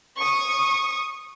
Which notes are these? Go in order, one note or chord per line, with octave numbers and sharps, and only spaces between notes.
C#6 D#6